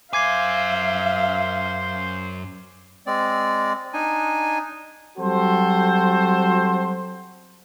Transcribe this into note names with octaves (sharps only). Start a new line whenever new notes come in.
F#2 C5 E5 F5 G#5 D6 G#6 C7
G#3 C4 D5
D4 D#4 G#5
F#3 G3 C4 F#4 A4 C5